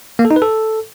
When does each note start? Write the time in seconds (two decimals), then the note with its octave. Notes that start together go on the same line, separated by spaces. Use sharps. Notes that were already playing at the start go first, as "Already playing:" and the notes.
0.19 A#3
0.25 A4
0.31 D#4
0.36 B4
0.42 A4